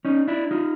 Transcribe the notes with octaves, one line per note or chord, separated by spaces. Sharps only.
C#4 D#4
D4 E4
D#4 F4